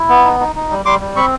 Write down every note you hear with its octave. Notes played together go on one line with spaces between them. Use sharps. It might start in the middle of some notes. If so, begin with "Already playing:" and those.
Already playing: E4
B3
D#4
D#4
D#4
G3
G3 C6 D6
G3
C4 B5 C#6